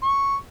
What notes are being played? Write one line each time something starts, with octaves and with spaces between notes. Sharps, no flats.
C#6